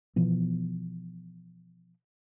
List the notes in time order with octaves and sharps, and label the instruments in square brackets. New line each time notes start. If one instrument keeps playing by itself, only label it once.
[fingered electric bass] B2 E3 F3 B3